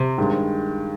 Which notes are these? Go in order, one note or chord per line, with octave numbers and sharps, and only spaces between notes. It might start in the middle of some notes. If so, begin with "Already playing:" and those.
Already playing: C3
G2 D#3 G#3